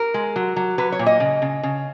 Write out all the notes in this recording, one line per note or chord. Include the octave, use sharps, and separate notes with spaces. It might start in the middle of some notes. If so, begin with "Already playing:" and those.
Already playing: A#4
G#3
F#3
F#3
F#3 B4
C#5
A#2
D#5
C#3
C#3
C#3